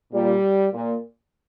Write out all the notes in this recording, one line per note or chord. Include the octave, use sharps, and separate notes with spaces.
A#2 G3
A#2